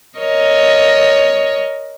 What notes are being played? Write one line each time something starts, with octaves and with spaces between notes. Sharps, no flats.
A#4 C#5 D#5